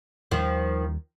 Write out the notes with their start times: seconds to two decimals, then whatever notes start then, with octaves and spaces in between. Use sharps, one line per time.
0.31 D#2 D#3 F3 G3